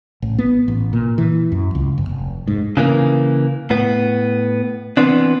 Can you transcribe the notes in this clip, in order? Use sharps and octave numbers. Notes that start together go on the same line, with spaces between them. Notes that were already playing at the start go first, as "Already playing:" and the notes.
A1
B3
A1
A#2
E3
F#2
C#2
G1
F1
G#2
C#3 E3 A#3
A2 B3
E3 B3 C4 D4